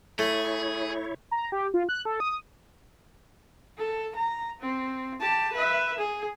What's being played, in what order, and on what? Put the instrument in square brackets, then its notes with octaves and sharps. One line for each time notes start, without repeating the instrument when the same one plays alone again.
[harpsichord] A3 [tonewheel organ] E4 C#5 [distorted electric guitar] G#4
[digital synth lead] A#5
G4
F4
F#6
A4
D#6
[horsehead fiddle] A4
A#5
C4
G4 A5
B4 E5
G#4